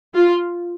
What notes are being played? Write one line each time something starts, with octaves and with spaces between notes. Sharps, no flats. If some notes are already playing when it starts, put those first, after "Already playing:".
F4